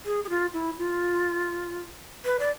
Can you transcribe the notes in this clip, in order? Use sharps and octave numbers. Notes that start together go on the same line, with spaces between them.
G#4
G#4
F4
E4
F4
B4
D5